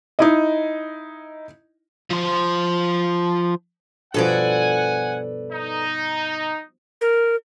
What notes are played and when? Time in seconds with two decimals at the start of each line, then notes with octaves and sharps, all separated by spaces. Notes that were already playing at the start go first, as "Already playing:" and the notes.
0.19 D#4 E4 D#5
2.11 F3 C5
4.14 G2 B2 F3 A4 B4 D5 F#5 G#5
5.53 D#4
7.01 A#4